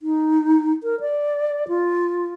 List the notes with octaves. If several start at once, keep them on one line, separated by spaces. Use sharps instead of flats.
D#4
A#4
D5
F4